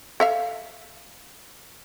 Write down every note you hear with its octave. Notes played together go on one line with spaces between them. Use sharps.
A4 E5 F5